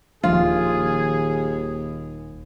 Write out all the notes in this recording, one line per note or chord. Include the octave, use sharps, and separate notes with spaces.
D#1 D#2 F3 D4 F4 G#4